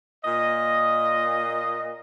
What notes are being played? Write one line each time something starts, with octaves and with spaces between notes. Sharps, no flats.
A#2 D#5